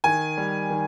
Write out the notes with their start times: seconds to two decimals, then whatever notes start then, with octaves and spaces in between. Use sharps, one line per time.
0.04 D#3 G#5
0.38 G3
0.70 D#3